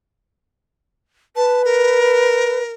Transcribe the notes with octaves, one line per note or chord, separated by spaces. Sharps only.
B4 A5
A#4